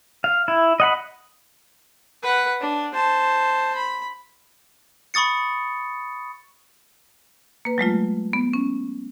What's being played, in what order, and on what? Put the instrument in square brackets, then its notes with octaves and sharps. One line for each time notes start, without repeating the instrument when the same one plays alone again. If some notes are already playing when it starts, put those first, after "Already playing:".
[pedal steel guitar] F5
E4
D#5 F#5 B5
[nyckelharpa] B4 F#5
D4
C5 A5
B5
[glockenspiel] B5 C#6 D#6 A6 C#7
[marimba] A#3 B4
F#3 G#3 A3 F4
B3
C#4